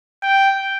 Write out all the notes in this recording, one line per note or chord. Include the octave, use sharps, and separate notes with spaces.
G5